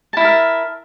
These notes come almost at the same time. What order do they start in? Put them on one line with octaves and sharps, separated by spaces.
A5 E4 E5 A#4